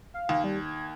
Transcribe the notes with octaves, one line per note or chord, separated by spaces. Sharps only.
F5
D#2
G3
G#6